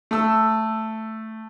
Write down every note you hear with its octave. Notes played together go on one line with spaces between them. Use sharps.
A3 E6